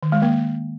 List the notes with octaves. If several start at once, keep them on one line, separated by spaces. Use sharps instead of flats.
D#3
G#3
A#3